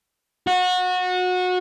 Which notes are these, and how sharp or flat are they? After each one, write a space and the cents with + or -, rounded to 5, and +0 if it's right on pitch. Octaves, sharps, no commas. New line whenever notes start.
F#4 -25